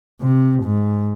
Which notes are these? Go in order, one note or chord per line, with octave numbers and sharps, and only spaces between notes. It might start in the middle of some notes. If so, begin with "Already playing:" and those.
C3
G#2